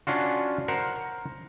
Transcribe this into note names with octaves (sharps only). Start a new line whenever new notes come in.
C#4 D4 F4 F#4
A#4 C5 F#5